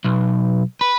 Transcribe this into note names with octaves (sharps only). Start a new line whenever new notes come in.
B1
B4